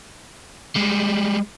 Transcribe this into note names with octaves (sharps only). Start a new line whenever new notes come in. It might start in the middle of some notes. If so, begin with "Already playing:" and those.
G3 G#3